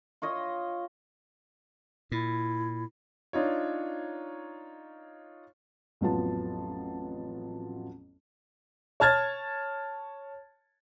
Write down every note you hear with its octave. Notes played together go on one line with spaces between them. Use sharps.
F4 C#5 D#5
A#2 E4
D4 D#4 F4 C#5
A1 F2 F#3 B3 F4 A5
C#5 A5 F6 G#6 A6